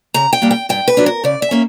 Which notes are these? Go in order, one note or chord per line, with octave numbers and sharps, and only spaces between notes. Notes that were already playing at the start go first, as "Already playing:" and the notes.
C#3 A#5
G5
G3 A#3 D4
G5
G2 G5
B4
F#3 B3 D4
A#4
C#3 D5
E5
A#3 C#4